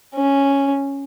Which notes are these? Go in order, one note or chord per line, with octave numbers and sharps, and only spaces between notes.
C#4